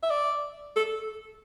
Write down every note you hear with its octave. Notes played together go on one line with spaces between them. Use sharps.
E5
D5
A4